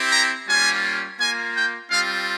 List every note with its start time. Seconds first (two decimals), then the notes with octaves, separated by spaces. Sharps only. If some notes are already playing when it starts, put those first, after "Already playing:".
Already playing: C4 E4 G4
0.11 A#5
0.47 G3 A#3 C#4 F4 G#5
1.19 A#3 F4 G#5
1.55 G5
1.90 G3 C4 F4 F5